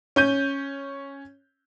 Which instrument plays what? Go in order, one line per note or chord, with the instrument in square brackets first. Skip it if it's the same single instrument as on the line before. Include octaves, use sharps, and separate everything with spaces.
[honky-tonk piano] C#4 G6 D#7